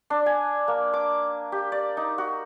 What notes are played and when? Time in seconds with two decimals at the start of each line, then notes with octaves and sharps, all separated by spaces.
0.10 D4
0.26 G#5
0.68 A#3
0.94 D6
1.52 G4
1.72 D5
1.97 D#4
2.18 F#4